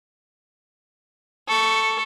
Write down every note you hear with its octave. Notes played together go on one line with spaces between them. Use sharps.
A4 C#6